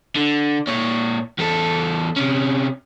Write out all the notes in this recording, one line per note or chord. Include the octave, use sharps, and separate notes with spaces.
D3
A#2 C#5
E2 A4
C3 C#4